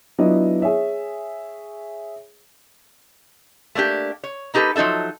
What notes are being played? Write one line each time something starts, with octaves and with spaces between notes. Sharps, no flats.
F#3 B3 D4 E4 F4 D#5
G#4 C#5 E5
A3 A#3 D4 G4
C#5
A#3 D#4 G4 A4 B4
F3 F#3 D#4 A4 E5